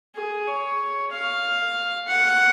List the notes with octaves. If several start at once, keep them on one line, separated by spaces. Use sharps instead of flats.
G#4
C#5
F5
F#5